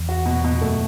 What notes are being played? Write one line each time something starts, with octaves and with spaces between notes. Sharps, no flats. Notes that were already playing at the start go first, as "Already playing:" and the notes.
Already playing: E2
F#4
B2
B2
F#2 A3